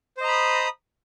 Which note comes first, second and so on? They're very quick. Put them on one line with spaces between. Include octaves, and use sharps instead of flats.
C5 D#5 A#5 B5 D#6